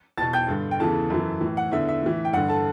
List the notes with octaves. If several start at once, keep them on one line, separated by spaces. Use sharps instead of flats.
E2 B2 A5 A6
G5 G6
G2 D3
G5
E2 C#3 E3 A4 A5
F#2 E3
A2 E3
F#5
E2 D3 E5
E5
A2 E3
G5
G2 D3 F#5
A4 A5